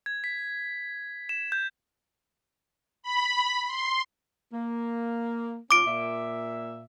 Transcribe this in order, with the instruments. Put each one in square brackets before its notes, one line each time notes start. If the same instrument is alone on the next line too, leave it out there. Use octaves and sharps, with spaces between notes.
[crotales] G#6
B6
E7
G6
[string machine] B5
C6
[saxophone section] A#3
[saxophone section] D#2 C#4 F4 [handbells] D6 D7
[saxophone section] A#2 E5